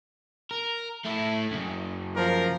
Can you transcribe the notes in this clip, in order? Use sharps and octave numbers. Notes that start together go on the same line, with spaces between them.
A#4
A3 E4
F#2 C#3
F3 A#4